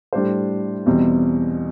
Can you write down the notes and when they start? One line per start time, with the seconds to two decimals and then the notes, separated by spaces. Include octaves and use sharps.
0.13 A2 G3 D4 G4 C5
0.86 E2 B2 G3 C4